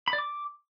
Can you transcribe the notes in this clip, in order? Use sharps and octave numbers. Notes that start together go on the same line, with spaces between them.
B5
D5
D6